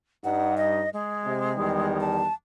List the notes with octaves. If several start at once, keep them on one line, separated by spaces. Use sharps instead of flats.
G2 D#4 F#5
D#5
G#3
C3
E2 D#3 G3
A5